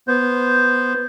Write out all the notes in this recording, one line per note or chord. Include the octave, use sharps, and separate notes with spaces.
B3 C5